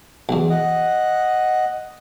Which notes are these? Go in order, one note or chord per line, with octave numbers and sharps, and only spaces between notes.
B1 E2
D#5 F#5